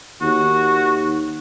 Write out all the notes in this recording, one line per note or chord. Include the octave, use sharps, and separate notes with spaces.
D#2 F#4